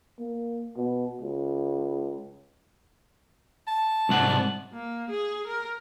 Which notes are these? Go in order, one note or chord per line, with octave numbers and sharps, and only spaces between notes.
A#3
B2
C#2
A5
C2 G#2 F#5
A#3
G#4
A#4